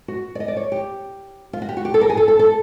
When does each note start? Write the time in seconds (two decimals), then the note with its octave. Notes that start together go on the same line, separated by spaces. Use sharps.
0.08 F#4
0.35 D5
0.40 D#5
0.48 D5
0.57 C#5
0.72 G4
1.53 F4
1.62 F#4
1.69 G4
1.77 F#4
1.85 G4
1.94 A4
2.01 A#4
2.10 G#4
2.17 A4
2.28 A4
2.39 A4